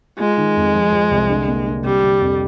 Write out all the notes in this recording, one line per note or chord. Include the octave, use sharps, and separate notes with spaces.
G#3 F4
D#3
F2
F3
F3
C2
D3
A#3
D3
C3 G3
C3
F2